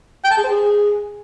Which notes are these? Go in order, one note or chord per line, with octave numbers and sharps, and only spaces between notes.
G5
A5
G#4
C5
G#4